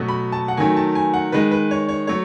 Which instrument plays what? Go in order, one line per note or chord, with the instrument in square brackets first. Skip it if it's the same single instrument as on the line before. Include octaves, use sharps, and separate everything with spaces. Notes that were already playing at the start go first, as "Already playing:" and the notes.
Already playing: [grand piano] B2 F#3 A3
B5
A5
F#5
D#3 F#3 A3 G#5
A5
G#5
F#5
D#3 G#3 B4
B4
C#5
C#5
F#3 A3 C#5